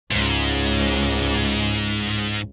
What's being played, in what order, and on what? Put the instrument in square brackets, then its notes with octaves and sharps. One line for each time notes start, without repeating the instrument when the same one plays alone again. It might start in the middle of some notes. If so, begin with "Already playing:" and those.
[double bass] C#2 [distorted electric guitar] G#2